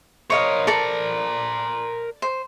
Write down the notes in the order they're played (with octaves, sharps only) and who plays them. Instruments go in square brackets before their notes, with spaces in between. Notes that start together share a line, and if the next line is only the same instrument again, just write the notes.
[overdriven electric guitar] A#4 C5 [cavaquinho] C#5 D#5 F5
[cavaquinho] A4 D5 A#5
C5